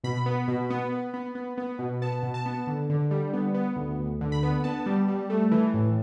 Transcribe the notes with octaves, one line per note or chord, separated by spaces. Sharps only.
B2 B5
B3
B2
B3
B3
B3
B3
B3
B2
B3 A5
B2
A5
B3
D3
D3
G3
B3
B3
D2
D2
D3
B5
B3
B3 A5
G3
G3
A3
E3
A2